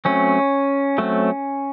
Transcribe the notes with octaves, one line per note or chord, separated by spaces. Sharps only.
F#3 A3 C4 C#4
F#3 A3 C4